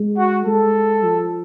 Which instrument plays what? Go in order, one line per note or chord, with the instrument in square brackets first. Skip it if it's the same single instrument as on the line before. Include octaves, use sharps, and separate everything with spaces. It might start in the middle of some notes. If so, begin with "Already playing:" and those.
Already playing: [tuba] G#3
[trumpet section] F#4
[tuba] G#3 [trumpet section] A4
[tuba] F3